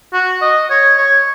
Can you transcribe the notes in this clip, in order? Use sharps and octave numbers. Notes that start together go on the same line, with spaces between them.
F#4
D#5
C#5
C#5